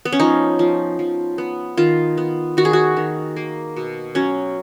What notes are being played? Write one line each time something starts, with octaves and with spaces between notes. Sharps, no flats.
B3
C#4
F3 D#4
F3
F3
B3
D#3 F4
B3
D#3 F#4
G#4
F#4
D#3
A#3
B2
F#3 C#4